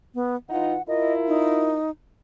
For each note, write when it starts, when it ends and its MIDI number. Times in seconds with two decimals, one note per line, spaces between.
0.14 0.36 59
0.50 0.75 52
0.50 0.75 63
0.50 0.75 65
0.50 0.82 78
0.88 1.77 64
0.88 1.77 65
0.88 1.77 70
0.88 1.13 75
1.28 1.90 63